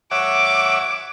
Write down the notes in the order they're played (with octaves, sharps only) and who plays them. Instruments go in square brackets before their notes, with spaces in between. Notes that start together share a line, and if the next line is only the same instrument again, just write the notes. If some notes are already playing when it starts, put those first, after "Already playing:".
[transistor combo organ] C#5 E5 F#5 [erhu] D6